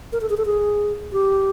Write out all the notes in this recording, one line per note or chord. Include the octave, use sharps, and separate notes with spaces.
A#4
A4
G#4
A4
G#4
G4